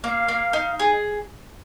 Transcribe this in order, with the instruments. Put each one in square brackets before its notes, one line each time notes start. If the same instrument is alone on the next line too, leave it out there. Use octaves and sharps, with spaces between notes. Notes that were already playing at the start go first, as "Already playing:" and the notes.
[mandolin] A#3 [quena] F5
[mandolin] A#3
D#4
[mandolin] G#4 [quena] G#5